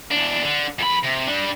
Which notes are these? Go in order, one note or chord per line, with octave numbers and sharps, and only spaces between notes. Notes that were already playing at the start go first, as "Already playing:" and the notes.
E2 D4
D3
F2 B5
C3
G3 D4